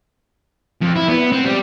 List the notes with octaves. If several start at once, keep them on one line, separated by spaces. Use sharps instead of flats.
F2
E4
B3
C4
G3